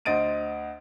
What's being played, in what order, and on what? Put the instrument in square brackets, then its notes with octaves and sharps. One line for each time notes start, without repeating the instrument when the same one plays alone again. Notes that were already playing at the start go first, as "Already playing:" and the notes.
[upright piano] D2 C5 D#5 A6 D7 D#7